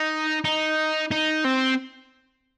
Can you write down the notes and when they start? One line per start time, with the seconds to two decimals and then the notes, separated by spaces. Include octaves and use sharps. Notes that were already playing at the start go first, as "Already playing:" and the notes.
Already playing: D#4
0.44 D#4
1.11 D#4
1.45 C4